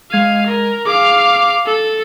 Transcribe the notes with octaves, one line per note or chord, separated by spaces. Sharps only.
G#3 F5 G#6 D#7
A#4
G#4 F5 D6
A4